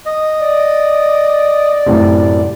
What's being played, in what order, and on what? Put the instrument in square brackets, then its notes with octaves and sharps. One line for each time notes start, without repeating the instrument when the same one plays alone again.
[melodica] D#5
[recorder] D5
[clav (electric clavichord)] F#2 A2 C3